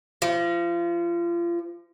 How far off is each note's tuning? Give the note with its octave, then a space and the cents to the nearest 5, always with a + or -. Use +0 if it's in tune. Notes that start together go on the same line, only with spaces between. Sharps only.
F3 -30